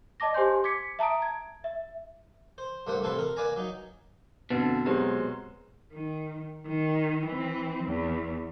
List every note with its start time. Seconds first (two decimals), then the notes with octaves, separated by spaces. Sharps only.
0.20 D5 D#5 A5 D6 A#6
0.34 G4 C5 G#5 C6 G6
0.64 D6 G#6 B6 C#7
0.99 E5 A5 A#5 D#6 D7
1.22 G#6
1.64 E5
2.58 C5
2.87 G2 A3 A#3 C5 F#5
3.02 A1 C3 E4 A4 B4 C6
3.19 A#4
3.36 A#3 B4 D5 G#5 A#5
3.56 F#3 D#4
4.50 F2 B2 D3 B4 A6
4.85 F#3 G#3 C4 G4 B4 A#5
5.93 D#3
6.68 D#3
7.26 E3 C4
7.85 E2